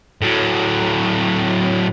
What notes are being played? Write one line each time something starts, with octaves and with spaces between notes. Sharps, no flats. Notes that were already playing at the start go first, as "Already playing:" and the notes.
A2 F#3